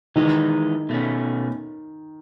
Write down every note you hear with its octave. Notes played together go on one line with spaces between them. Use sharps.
D#3 E3 G#3 D#4
B2 A3 C#4